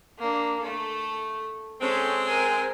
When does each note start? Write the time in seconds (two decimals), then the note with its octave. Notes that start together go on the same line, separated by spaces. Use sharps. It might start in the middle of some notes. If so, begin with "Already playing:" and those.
0.19 A#3 D4
0.62 A3 A4
1.81 G#3 C4 C#4 A4
2.26 A#4 G#5